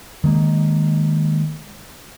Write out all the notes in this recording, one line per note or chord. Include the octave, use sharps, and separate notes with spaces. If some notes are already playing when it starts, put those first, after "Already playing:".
D#3 G#3 A#3